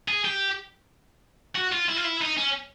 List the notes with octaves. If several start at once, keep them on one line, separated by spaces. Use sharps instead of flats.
G#4
G4
F#4
F4
E4
F4
E4
D#4
C#4